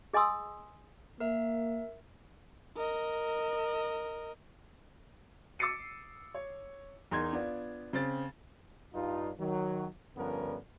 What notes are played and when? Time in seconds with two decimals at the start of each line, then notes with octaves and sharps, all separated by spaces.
0.13 G#4 D#5 G#5 C6 D#6 E6
1.20 A#3 A#4 E5
2.77 A#4 D#5
5.59 D6 E6 A6 C7 C#7 D#7
6.34 C#5
7.11 E2 D#4 A#4 C6 G#6
7.33 B3 D4 F4
7.93 C#3 C4 A6
8.93 G2 D#4 F4
9.39 D#3 F#3
10.17 G2 D3 F3 B3 C#4 A#4